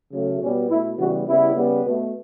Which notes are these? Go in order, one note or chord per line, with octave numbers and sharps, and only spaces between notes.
C#3 F#3 A3
B2 G3 B3 C#4
B2 A3 E4
C#3 E3 G3 B3 F#4
C#3 G3 B3 E4
C#3 G3 B3
B2 A3